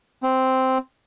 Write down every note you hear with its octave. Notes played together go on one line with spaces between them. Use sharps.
C4